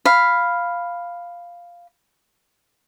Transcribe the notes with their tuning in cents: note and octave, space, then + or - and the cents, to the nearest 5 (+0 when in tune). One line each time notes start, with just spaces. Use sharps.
F5 +0 B5 +0